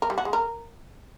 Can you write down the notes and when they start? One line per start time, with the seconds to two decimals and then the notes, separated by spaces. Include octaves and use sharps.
0.02 A#4
0.10 G3
0.18 F#4
0.25 G#3
0.33 A#4